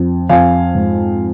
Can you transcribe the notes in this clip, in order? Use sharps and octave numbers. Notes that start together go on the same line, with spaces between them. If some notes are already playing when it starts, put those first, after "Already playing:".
Already playing: F2
F2 F5 G#5
G#2